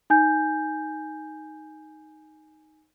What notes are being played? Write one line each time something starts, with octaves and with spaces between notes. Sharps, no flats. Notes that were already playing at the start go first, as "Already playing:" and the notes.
D#4 G#5 G6